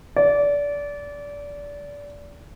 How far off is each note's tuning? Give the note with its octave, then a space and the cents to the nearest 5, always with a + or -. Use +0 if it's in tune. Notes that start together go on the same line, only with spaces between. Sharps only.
D5 -25